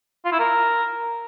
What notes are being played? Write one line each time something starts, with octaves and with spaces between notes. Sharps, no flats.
F4
E4
A#4